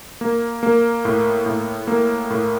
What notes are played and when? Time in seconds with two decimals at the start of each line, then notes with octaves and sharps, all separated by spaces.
0.21 A#3
0.63 A#3
1.05 A2
1.46 A2
1.87 A#3
2.30 A2